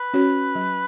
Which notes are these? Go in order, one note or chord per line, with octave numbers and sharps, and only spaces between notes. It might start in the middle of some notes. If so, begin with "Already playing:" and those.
Already playing: B4
C#4 F#4 C#5
F#3